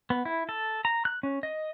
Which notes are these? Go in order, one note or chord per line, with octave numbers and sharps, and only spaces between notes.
B3
E4
A4
A#5
F#6
C#4
D#5